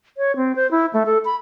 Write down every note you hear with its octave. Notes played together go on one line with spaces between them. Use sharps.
C#5
C4
C5
E4
A3
A4
B5